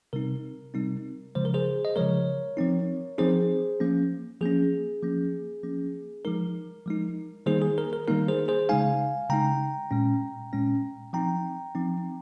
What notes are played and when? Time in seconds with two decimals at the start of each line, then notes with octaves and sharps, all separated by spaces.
0.13 C3 G3 C4 D#4 A#4
0.74 C3 G3 C4 D#4
1.35 C#3 F3 G#3 C5
1.45 A#4
1.54 G#4 C5
1.85 D#5
1.96 C#3 F3 G#3 A#4 C#5
2.57 F3 C4 D#4
3.18 F3 C4 D#4 G#4 C5
3.80 F3 A#3 C#4
4.41 F3 A#3 C#4 G#4
5.02 F3 A#3 C#4
5.63 F3 A#3 C#4
6.25 F3 G#3 D#4 A#4
6.86 F3 G#3 D#4
7.46 D#3 G3 A#3 D#4 G#4 C5
7.62 G#4
7.78 A#4
7.93 A#4
8.08 D#3 G3 A#3 D#4 A#4
8.28 G#4 C5
8.48 G#4 C5
8.69 C#3 G#3 D#4 F5 G#5
9.30 C#3 G#3 D#4 G5 A#5
9.91 A#2 G#3 C#4
10.53 A#2 G#3 C#4
11.13 F3 C4 D#4 G5 A#5
11.75 F3 C4 D#4